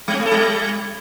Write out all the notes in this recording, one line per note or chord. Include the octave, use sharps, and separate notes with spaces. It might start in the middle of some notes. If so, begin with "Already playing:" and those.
G3
C4
A3
A4
G3